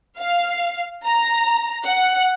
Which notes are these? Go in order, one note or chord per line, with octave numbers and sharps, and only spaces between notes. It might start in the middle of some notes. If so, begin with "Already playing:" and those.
F5
A#5
F#5